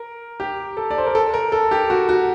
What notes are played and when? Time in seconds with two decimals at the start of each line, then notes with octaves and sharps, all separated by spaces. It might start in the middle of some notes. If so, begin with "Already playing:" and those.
Already playing: A#4
0.40 G4
0.77 A4
0.91 D5
0.98 C5
1.07 A#4
1.15 A4
1.34 A#4
1.52 A4
1.71 G4
1.90 F#4
2.09 F#4